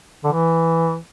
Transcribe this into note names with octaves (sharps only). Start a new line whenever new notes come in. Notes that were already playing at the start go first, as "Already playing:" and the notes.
D3
E3